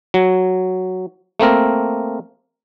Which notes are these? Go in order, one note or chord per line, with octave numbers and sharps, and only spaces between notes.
F#3
A3 A#3 C4 A#4